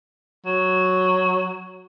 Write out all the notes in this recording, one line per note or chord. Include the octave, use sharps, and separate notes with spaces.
F#3